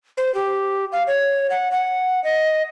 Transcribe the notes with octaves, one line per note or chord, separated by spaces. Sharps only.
C5
G4
F5
C#5
F#5
F#5
D#5